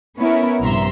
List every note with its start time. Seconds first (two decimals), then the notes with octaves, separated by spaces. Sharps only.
0.18 B3 C#4 E4 A#4
0.61 A#1 G2 C3 E5 A#5 C6